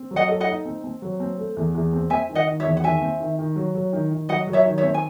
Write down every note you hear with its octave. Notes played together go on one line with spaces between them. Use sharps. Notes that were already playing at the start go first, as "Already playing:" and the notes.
Already playing: C4
F#3
D#5 F#5
A4
D#5 F#5
D#4
C4
C4
F#3
C4
A3
E2
E2
C4
C4 E5 G#5
D#3
D#5 F#5
D#3
C#5 E5
E2
F#5
D#3 E5 G#5
C4
D#3
D#3
F#3
F#3
D#3
D#3
F#3 D#5 F#5
F#3
C#5 E5
D#3
C#5 E5
C4
G#5